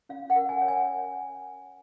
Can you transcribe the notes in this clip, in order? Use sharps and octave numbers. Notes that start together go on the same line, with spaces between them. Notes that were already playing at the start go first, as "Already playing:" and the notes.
C#4 F5
F#5
A#4
G#5
C#5
G#5